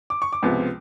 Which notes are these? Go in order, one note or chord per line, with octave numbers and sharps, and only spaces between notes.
D6
C#6
D6
C#2 C3 F3 G#3 B3